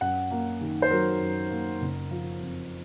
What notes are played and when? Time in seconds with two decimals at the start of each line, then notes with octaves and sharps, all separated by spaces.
0.01 F#2 F#5
0.31 A#3
0.61 D#3
0.82 C5
0.90 F#3 A#4
1.21 F#2
1.51 A#3
1.81 F#1
2.11 F3
2.40 F2